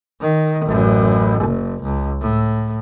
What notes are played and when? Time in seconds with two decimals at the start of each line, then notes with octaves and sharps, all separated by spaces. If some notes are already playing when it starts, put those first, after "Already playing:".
0.21 D#3
0.65 A1 F#2
1.42 F#1
1.83 C#2
2.21 A2